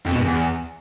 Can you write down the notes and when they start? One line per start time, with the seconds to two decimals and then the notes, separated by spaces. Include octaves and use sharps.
0.06 F2
0.12 B2
0.19 G2
0.25 E2